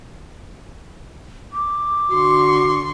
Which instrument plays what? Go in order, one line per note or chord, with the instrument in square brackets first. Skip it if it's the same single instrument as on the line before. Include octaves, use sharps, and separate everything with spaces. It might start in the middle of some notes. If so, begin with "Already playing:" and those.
[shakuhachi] D6
[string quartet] D3 C6 C#6 [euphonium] F#4